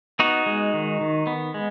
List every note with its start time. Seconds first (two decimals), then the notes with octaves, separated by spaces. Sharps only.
0.19 B3 D#4 F#4
0.46 G#3
0.74 D#3
1.01 D#3
1.27 B3
1.54 G#3